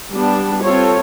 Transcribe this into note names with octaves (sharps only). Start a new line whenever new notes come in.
G3 B3 D4
C4 F4 A4 C#5